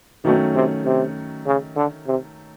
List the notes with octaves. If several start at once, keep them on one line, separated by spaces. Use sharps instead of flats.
B2 D#3 F#3 A3 C#4
C3
C3
C#3
D3
C3